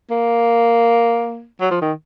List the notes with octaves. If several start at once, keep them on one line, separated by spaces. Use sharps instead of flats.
A#3
F#3
F3
D#3